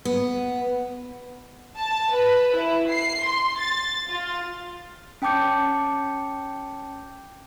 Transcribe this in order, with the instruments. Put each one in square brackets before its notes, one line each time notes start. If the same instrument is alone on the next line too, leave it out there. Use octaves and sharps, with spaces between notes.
[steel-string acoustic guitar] B3
[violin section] A5
B4
E4
C7
C6
A6
F4
[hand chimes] C#4 G5 A5 D6 G6 C#7